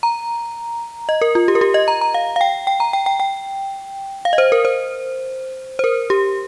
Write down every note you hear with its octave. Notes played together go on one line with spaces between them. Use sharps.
A#5
D#5
A#4
F4
G4
A#4
G4
D#5
A#5
A#5
F5
F5
G5
G5
A#5
G5
G5
G5
F5
D#5
C5
A#4
C5
C5
A#4
G4